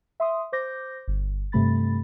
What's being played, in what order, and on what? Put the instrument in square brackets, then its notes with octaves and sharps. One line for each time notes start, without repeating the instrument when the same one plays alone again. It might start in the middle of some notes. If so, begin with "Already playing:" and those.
[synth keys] E5 C6 D#6
C5 D6 G6 A#6
G1
G2 C3 A3 B5 A6